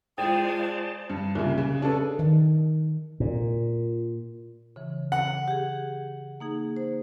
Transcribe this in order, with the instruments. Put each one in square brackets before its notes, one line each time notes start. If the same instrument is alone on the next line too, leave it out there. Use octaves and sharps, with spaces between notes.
[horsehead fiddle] G#3 F4 [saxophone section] G#4 [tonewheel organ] C5 D5 A5 [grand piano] G5
[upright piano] G2
C2 A#2 C#3
C#3
C#4 D4 G#4 A4 B4
[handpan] D#3
[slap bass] A#2
[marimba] C#3 E3
[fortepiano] F#5
[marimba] G4 G#4
A#3 D#4 G#4
C5